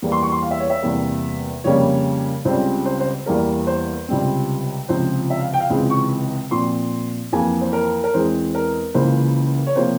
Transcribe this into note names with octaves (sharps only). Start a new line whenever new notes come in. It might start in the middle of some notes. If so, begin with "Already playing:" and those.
E2 E3 G3 A#3
C6
C#6
C6
F5
E5
C#5
E5
E2 C3 G3 A#3
F2 C#3 G3 A#3 C#5
C#2 C#3 G3 C4 C5
C5
C5
E2 E3 G3 A#3 A#4
C5
C#2 C3 G3 C4
C#2 C3 F3 C4 C5
E5
F5
G5
F5
C#2 C3 E3 G#3 C4
C#6
A#2 F3 C4 C6
F2 E3 A#3 G#5
C5
A#4
A#4
E2 E3 G#3 C4 C5
A#4
C#2 C#3 E3 A#3 C5
C#5
C3 F3 A#3 C5